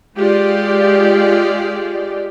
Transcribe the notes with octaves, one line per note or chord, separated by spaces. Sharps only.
G#3 F4 G4 D5